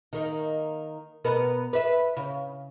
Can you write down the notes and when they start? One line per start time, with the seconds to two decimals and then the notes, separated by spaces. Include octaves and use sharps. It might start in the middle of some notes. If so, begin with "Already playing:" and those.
0.13 D#3 A#3
1.24 B2 B3 A#4
1.73 B4 E5
2.17 C#3